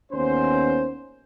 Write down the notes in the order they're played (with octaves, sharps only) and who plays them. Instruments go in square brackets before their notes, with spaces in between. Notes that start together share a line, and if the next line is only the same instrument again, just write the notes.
[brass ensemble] D#2 B3 C#4 C5